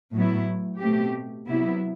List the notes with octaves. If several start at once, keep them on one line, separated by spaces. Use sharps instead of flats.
A2 F#3 B3 E4
B2 A3 C4 G4
C3 F#3 B3 E4